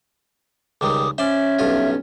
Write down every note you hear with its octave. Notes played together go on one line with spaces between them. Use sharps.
C#2 D#3 G3 D6 D#6
C#4 C5 D5 E5
B1 G2 F4